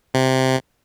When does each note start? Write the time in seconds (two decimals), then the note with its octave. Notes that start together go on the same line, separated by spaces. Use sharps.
0.14 C3